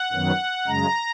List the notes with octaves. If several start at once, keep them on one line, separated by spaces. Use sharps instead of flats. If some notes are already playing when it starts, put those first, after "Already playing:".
Already playing: F#5
F#2 D#3 F#3 B3
F#2 C#3 G#3 A#5